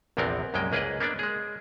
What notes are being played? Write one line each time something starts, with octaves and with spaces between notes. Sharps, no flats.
A#1 E2 C3 B3 C4 A#4
C2 F#2 G#3 A#3 G5
C#2 A#3 G#4 B4 D5 D#5
A#3 B3 D4 D5
G#3 G#4